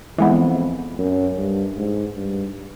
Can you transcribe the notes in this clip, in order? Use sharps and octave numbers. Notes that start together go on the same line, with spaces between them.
F2 E3 G#3 B3
F#2
G2
G#2
G2